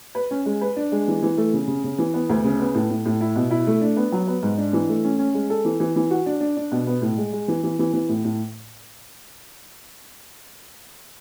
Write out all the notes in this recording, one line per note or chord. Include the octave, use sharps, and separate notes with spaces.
B4
C#4
G#3
B4
D4
G#3
E3
E3
A3
C#3
C#3
C#3
E3
B3
D2
C#3
B3
A2
A2
A2
E4
B2
E4
A3
D4
B3
F#3
B3
G#2
D4
E3
A3
C#4
C#4
G#3
A4
E3
E3
E3
F#4
D4
D4
D4
B2
B3
A2
G#3
G#3
E3
E3
E3
E3
A2
A2